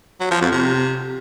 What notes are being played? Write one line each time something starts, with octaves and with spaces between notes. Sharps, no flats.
F#3
F3
F2
C3